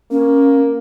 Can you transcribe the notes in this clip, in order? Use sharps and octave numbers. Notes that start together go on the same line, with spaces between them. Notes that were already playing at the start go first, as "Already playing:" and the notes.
A#3 C#4